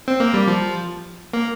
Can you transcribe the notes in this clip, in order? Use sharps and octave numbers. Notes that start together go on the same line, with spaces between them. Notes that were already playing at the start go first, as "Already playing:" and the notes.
C4
A#3
G3
F3
A#3